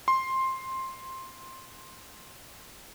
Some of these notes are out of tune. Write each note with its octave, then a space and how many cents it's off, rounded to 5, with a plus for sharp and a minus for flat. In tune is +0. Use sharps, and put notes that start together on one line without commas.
C6 +10